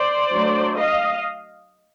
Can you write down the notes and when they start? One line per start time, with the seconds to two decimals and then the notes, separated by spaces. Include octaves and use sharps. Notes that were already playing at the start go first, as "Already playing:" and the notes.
Already playing: C5 D5
0.33 F#3 A3 D4
0.77 D#5 F5